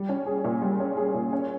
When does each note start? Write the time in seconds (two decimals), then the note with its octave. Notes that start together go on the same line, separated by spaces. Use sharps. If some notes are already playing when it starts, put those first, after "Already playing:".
Already playing: G3
0.09 C#4
0.26 G#4
0.44 A#2
0.62 G3
0.80 C#4
0.97 G#4
1.14 A#2
1.33 C#4